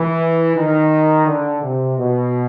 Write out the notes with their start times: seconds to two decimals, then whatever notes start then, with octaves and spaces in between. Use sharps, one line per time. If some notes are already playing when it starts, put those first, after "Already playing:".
Already playing: E3
0.56 D#3
1.27 D3
1.63 C3
1.98 B2